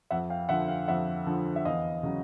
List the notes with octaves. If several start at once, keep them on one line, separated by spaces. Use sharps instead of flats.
F2 E5 F#5
F5 G5
D3 F3 E5 F#5
F5 G5
F2 E5 F#5
D3 F3
E5
E2 D#5 F5
C#3 F#3